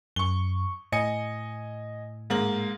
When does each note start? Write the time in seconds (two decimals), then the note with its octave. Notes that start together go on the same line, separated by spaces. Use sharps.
0.16 F#2 C#6 G7
0.92 A2 D#5 G#5 C#7
2.30 G#2 A#3 F#7